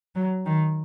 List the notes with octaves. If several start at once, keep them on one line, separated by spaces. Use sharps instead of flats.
F#3
D#3